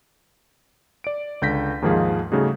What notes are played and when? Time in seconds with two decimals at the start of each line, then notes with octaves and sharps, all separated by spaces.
1.04 D5 D7
1.42 C#2 D3 G6 A#6 B6
1.82 D#2 G#2 D#3 F3 G#4 F5
2.32 C#3 G3 A3 D#4 F#4 G#4